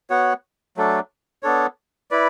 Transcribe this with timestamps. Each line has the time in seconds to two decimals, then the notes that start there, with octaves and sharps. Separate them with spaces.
0.10 B3 F#4 C#5 F#5
0.77 F#3 A3 D4 A4
1.43 B3 D4 A4 C#5
2.11 E4 B4 D5